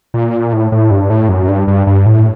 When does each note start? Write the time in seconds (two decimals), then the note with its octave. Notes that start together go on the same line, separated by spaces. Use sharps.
0.14 A#2
0.53 A2
0.72 A2
0.91 G2
1.10 A2
1.29 F#2
1.48 G2
1.68 G2
1.87 G2
2.06 A2